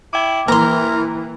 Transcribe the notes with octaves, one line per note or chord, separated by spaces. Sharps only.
E4 G5 D6
E3 A#3 A#4 A#5 C6